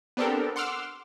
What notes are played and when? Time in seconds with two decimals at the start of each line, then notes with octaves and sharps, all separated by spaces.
0.17 B3 C4 D4 G4 A4 A#4
0.56 F#5 C6 D6 E6 F6